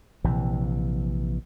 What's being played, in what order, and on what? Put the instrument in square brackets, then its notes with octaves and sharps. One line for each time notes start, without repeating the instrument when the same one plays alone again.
[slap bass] A#1 C3 E3